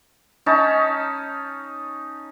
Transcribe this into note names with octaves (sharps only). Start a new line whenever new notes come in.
C#4 D#4 A5